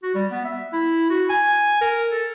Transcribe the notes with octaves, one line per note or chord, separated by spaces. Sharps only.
F#4
G3
B3
E5
E4
F#4
G#5
A#4
A4